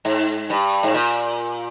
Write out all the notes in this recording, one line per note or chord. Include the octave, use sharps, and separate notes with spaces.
G#2
G2
G#2
A#2